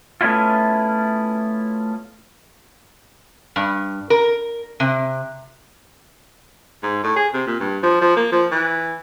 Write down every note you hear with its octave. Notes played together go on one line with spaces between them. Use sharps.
A3 B3 C#4 E4 F4
G2
A#4
C3
G#2
A2
G#4
C3
A#2
G2
F3
F3
A#3
F3
E3